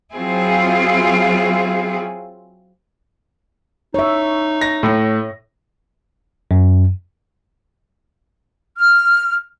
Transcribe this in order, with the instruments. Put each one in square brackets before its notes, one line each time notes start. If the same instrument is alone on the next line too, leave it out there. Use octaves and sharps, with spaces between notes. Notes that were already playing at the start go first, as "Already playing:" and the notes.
[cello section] F#3 C4 E4 F4 G#4
[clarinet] D#4 [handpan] C#5 E5
[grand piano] A#6
A2
[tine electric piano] F#2
[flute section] F6